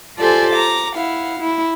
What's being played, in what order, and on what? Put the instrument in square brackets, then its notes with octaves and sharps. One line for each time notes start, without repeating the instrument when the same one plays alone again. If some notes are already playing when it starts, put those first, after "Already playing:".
[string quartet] F4 G4 A4 C5 D5 G#5
A#5 D6
E4 F5 F#5
E4